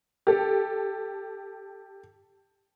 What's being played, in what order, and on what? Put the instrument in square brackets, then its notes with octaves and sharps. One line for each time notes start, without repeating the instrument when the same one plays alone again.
[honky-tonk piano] G4 A4